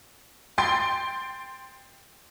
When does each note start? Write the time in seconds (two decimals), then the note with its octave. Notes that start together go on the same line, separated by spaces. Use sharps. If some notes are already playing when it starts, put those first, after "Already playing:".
0.58 G5 C6 A6 D7